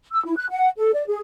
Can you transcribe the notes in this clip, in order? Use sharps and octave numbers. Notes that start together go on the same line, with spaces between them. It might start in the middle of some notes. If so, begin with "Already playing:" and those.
E6
E4
F#6
F#5
A4
D5
G#4